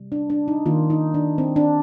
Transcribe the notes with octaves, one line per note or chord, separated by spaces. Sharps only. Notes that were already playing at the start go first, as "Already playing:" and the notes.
Already playing: C3 G3
D4
D4
D#4
D#3 A#3 F4
D#4
D4
C4
D4